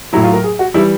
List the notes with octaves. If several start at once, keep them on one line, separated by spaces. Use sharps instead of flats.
A2 F#3 E4
F4
A#4
G#4
F#4
E3 G3 E4